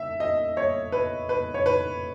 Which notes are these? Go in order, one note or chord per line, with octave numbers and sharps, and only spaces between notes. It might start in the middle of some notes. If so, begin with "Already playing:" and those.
Already playing: E5
D#5
C#5
B4
B4
C#5
B4